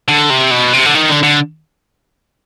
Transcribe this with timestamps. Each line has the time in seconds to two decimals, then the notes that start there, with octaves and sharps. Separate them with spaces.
0.09 D3
0.30 C3
0.51 B2
0.73 C3
0.86 D3
0.95 D#3
1.09 D3
1.23 D3